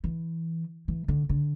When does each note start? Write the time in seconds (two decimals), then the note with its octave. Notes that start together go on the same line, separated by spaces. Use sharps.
0.04 E3
0.88 E3
1.08 D3
1.29 D3